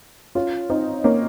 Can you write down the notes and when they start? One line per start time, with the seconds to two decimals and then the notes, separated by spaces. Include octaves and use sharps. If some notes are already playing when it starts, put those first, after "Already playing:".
0.35 C#4 F4
0.70 C4 D#4
1.04 A#3 C#4